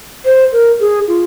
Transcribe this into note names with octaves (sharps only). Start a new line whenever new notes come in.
C5
A#4
G#4
F4